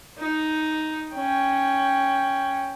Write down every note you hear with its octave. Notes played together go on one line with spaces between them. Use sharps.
D#4
C#4 G5